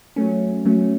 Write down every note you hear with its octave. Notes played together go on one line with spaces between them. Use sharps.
F#3 A3 C#4
F#3 A3 C#4